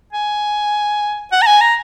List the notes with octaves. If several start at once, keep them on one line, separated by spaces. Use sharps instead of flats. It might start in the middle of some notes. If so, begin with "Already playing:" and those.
G#5
F#5
A#5
G#5
A#5